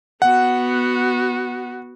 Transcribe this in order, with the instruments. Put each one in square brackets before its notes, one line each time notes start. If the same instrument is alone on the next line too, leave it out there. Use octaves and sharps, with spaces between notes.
[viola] B3 F#4 [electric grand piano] F#5